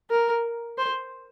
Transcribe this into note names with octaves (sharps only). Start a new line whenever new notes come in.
A#4
C5